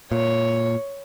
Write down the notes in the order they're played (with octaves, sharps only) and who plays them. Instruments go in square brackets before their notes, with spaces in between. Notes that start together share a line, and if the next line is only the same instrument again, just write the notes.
[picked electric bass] A#2 [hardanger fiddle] C#5